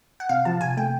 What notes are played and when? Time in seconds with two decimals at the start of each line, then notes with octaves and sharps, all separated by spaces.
0.20 F#5
0.29 C3 F5
0.45 F3 A5
0.61 C3 G#5
0.77 A3 G5